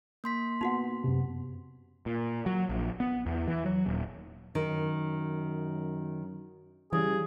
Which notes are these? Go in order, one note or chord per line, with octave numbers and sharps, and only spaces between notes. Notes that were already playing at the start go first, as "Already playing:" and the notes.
A#3 C6 B6
B3 D#4 F#4 F#5
F#2 C3
A#2
F#3
A#1
B3
E2
E3
F#3
D#1
F#2 D#3
C#3 E3 G3 G#4